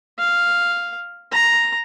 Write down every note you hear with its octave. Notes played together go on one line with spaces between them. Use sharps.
F5
A#5